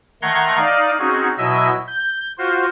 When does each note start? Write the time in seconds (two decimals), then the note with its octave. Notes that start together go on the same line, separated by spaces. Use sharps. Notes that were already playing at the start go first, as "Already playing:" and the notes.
0.22 D#3 A3 F#5 A#5 C6 G#6
0.57 D#4 D5 D#5 F5
0.99 C4 C#4 D#4 F#4 G#4
1.38 B2 F#3 E4 D#5 E5 E6
1.87 G6
2.38 F4 F#4 C5